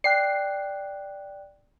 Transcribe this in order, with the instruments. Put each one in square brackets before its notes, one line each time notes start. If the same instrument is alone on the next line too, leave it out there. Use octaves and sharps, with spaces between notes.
[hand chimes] D5 G5 F#6 [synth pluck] C7